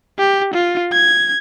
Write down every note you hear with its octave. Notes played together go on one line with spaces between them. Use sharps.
G4
F4
G#6